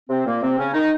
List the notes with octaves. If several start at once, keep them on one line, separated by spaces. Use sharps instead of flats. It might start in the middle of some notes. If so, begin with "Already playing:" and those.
C3 C4
A#2 A#3
C3 C4
C#3 C#4
D#3 D#4